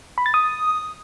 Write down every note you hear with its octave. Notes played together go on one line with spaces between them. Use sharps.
B5
A6
D#6